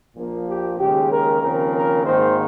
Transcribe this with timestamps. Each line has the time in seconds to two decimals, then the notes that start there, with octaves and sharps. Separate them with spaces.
0.16 A#1 A#2 F3 A#3
0.47 G4
0.79 D#2 C#3 G#3 G4
1.11 A#4
1.42 D#2 C#3 F3 C4 A#4
1.74 A#4
2.05 G#1 G#2 D#3 A#3 C5